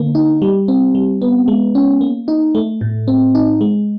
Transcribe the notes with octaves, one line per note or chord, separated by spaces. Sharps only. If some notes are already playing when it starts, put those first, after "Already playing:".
Already playing: D3 A#3
D#4
G3
C4
G3
B3
G#3
C#4
A#3
D#4
A3
A2
C4
D#4
G#3